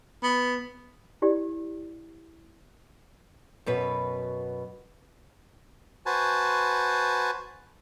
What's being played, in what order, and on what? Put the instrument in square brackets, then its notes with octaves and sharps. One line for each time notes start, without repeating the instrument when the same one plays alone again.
[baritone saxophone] B3
[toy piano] E4 G4 D5
[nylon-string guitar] F#2 B2 B4
[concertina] F#4 B4 C5 G#5 A5